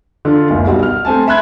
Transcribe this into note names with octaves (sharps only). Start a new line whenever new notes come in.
D3 F4
F#1 C#2
B1 G3 F#4
F6
A3 C4 G#5 A5
E5 B5 C6 F#6 G#6